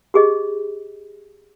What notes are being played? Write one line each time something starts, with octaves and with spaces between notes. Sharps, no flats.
G4 G#4 D#5